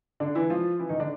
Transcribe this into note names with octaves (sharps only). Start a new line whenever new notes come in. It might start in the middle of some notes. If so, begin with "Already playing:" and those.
D3 D4
E3 E4
F3 F4
E3 E4
D#3 D#4
D3 D4